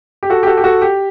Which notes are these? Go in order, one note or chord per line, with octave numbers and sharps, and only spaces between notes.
G4
F#4 A4
G4
F#4 A4
G4
F#4 A4
G4